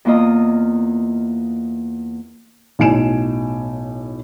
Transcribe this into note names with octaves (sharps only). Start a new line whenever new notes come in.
E2 A#3 E4 F4 D#5 A#5
B1 A2 G#5 D7 E7